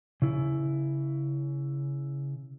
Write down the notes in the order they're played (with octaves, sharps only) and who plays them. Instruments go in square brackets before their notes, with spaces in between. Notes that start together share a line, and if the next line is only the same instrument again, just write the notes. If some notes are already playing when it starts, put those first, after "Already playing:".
[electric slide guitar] C#3 E4